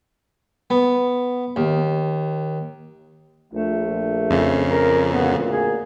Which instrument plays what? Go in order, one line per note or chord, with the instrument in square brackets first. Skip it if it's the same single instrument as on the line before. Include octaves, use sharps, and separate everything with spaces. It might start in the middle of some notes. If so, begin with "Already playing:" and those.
[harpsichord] B3
D#2
[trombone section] A#1 [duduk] A3
[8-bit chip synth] F2 C#3
[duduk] A#4
[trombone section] D2 A#2 A#3 [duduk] B3
[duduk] G#4